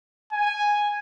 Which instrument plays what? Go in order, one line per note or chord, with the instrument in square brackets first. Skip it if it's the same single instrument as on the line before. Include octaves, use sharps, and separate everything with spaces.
[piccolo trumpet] G#5